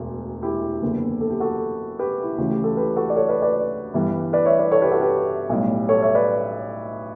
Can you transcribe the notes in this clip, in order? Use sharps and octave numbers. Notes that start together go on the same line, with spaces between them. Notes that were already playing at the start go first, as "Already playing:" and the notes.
Already playing: E1 D2
E4 G4
F#1 E2 D3
A4
G4
F#4 A4
G4 B4
E4
D2 C#3 E3 F#4
G4
A4
G4 B4
F#4 A4
D5
A4 C#5
B4 D5
B4 D5
G1 G2 E3 G3
B4 D5
C#5 E5
B4 D5
A4 C#5
G4 B4
F#4 A4
G4 B4
B1 A2 G3
A4 C#5
C#5 E5
B4 D5